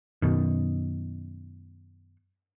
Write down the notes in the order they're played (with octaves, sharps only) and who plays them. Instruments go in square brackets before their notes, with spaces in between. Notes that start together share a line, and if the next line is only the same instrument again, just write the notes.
[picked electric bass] F#2 B2 D#3